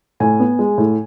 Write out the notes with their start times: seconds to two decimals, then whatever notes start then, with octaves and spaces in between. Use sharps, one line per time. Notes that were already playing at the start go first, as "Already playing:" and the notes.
0.20 A2 G#5
0.40 B3
0.59 G#3
0.78 A2